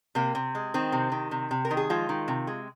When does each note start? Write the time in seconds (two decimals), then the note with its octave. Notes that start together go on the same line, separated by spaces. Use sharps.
0.15 C3 A#3
0.35 C3
0.55 G#3
0.74 D#3 C4
0.92 C3
1.12 D#3
1.31 C3
1.51 C3
1.65 A#4
1.71 D#3
1.77 G#4
1.90 F3 G#3 F4
2.09 D#3
2.28 C3
2.47 G#3